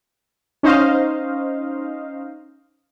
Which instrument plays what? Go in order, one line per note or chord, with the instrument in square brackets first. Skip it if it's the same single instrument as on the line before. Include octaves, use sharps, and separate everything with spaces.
[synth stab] C#4 D#4 C5 D#5 F5